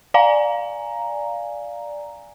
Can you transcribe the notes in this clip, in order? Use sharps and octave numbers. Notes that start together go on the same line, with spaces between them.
D5 F5 G#5 A#5